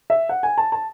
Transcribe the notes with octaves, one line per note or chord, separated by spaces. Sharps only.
E5
F#5
G#5
A5
A5